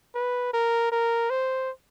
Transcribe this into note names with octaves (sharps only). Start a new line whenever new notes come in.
B4
A#4
A#4
C5